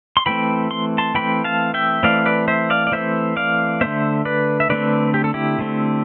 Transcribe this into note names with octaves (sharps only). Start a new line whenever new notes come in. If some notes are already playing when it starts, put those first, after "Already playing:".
C6
E3 A3 C4 G5 B5
C6
A5 C6
E3 A3 C4 G5 B5
F5 A5
E5 G5
E3 A3 C4 D5 F5
B4 D5
C5 E5
D5 F5
D5
E3 A3 C4 C5 E5
D5 F5
D3 A3 C4 C5 E5
B4 D5
E5
D3 A3 C4 B4 D5
G4
A4
E4 G4
D3 A3 C4